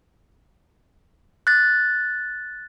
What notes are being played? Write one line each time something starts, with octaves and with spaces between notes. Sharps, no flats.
F#6 A6